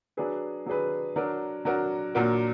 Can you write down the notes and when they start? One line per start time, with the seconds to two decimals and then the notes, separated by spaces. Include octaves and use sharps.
0.17 F#3 D4 G#4 B4
0.66 F#3 D4 G#4 B4
1.16 F#3 D4 F#4 A#4
1.65 F#3 D4 F#4 A#4
2.15 A#2 F#3 D4 F#4 A#4